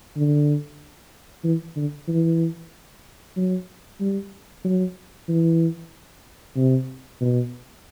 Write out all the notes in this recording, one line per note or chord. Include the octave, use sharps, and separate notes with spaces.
D3
E3
D3
E3
F#3
G3
F#3
E3
C3
B2